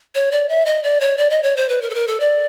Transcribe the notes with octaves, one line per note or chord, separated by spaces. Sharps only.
C#5
D5
E5
D#5
D5
C#5
D5
D#5
C#5
C5
B4
A#4
A4
A#4
A4
D5